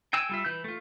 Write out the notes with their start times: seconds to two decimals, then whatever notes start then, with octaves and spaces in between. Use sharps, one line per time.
0.13 G5 G#5 E6
0.29 G3 F4 E5
0.45 E3 G6
0.64 A3 F4